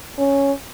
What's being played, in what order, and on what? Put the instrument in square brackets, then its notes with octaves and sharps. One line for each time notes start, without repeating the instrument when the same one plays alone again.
[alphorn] C#4